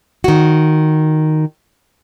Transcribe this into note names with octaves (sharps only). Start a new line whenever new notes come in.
D#3 F#4